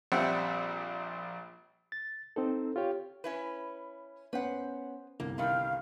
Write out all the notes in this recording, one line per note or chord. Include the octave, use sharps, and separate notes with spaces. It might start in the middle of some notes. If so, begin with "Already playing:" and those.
A#1 G3 C4 E5 F#5 G5
A6
C4 D#4 A4
F4 G4 C#5 G5
C#4 E4 B4
B3 C#4 B4 C5 F#5
G1 C2 A#3
C3 D#3 G3 F5